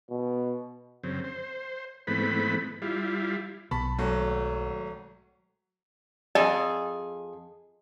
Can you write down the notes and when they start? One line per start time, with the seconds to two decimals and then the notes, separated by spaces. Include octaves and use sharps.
0.10 B2
1.03 F#2 C#3 C4
1.24 C5
2.07 G#2 E3 A3 B3 C4 B5
2.82 G3 E4 F4
3.71 B1 A5 B5 B6
3.99 G#1 F#3 A3
6.35 F2 G#4 D#5